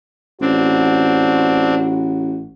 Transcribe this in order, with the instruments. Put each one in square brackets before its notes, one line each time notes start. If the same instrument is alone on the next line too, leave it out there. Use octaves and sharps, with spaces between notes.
[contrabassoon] A1 [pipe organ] C4 D4 [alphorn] F#4